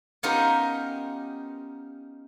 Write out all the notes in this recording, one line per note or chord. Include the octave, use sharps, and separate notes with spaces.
B3 C#4 D#4 F4 G4 A#4